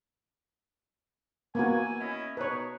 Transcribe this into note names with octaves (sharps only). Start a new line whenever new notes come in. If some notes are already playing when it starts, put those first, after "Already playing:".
A#3 B3 E4 F#4 G#5
C#4 E4 D#5
B2 D#4 B4 C#5